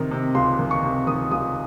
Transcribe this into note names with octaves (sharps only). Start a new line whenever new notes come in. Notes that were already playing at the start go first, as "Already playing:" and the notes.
Already playing: C3 D#3
C3
C#2 C6
D#3
C#6
C3
D#3 D#6
C#2 D#6